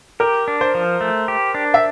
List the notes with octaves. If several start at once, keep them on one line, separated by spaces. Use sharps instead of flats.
G4 A#4
D4
C5
F3
A3
G4
D4
E5